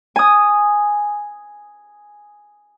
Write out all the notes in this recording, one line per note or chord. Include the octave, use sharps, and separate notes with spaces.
G#5 D#6